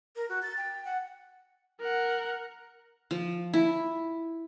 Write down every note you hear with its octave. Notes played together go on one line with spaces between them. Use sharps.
A#4
F#4
A6
G5
F#5
A#4 F#5
F3
E4